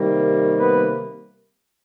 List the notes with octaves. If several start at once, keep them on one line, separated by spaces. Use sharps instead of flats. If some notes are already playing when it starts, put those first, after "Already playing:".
Already playing: C3 D#3 G3 A#3
B3 B4